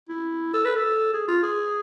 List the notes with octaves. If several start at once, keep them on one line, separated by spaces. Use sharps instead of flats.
E4
A4
B4
A4
G#4
F4
G#4